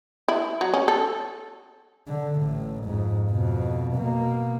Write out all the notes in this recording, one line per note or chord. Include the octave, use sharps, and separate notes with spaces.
E4
F#3
C#4
A4
D3
A1 A2
F2 G#2
F2 B2
B2 A#3